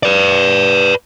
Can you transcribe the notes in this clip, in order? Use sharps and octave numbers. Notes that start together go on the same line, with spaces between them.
B4 D5